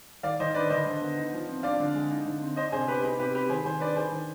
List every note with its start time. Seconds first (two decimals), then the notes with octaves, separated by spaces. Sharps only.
0.23 D#3 D5 F5
0.40 D#3 C5 D#5
0.54 D4 B4 D5
0.70 D3 C5 D#5
0.86 D3
1.01 B3
1.18 D#4
1.33 F3
1.48 C4
1.63 D4 D5 F5
1.80 D3
1.94 G#3
2.10 D#4
2.25 D3
2.41 C4
2.56 D4 C5 D#5
2.72 C3 G#4 C5
2.87 B3 G4 B4
3.03 D#4 G#4
3.19 C3 G4 B4
3.34 C4 G4 B4
3.50 D#3 G#4 C5
3.65 D#3 G#4 C5
3.80 D4 B4 D5
3.96 D4 G#4 C5
4.12 D#3